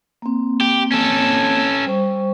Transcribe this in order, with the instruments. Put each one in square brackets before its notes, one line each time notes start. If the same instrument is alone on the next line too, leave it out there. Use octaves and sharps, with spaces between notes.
[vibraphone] A#3 C4
[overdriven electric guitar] G4
C#4 A4
[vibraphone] G3 C5 C#6